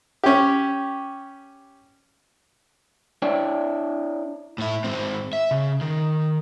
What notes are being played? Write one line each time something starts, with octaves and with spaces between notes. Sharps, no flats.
C#4 G4
D4 E4 C#5 D5 E5 G5
A2 E4
G#2 C4
E5
C#3
D#3